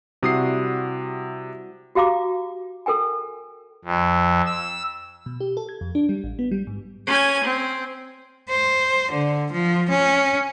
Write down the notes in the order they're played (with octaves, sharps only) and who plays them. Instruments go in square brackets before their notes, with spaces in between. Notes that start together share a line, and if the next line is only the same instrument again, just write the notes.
[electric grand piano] C3 D#6 C7 [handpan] G3 E4 F#4
[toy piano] F#4 G4 F5 A#5 D6
A4 A#4 G5 G#5
[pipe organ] F2
E6
[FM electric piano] B2
G4
A4
G#6
F2
D4
G3
A1
B3
G3
G#2
[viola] C#4 G#5
C4
[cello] C5
D3
F3
C#4